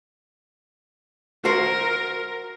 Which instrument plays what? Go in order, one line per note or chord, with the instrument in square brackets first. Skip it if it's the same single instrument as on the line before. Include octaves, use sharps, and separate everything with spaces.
[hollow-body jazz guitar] F#4 C5 [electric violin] A#4